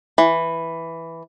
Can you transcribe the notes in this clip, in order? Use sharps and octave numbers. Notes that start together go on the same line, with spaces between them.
E3